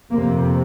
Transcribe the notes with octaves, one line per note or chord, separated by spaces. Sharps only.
F2 C3 A#3